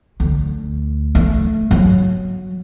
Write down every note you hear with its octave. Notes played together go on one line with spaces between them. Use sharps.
D2
A3
F#3